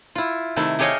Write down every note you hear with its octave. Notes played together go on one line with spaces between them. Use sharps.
E4 F4
C3 D#3 A3 E4
A3 G4 G#4 C#5 D#5 F5